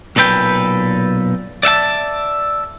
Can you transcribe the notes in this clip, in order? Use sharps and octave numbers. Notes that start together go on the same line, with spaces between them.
B1 A#2 A4 B4 G5
D5 E5 F#5 A5